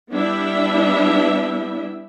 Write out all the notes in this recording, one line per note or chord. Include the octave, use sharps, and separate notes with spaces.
G3 B3 D4 E4 E5